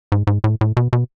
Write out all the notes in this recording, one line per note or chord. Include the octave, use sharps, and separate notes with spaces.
G#2
G#2
A2
A2
B2
B2